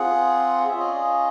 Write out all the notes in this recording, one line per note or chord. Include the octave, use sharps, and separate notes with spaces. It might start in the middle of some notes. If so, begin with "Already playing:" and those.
Already playing: C4 F4 G#4 F#5
C#4 F4 G#4 E5
D#5
D5
D#5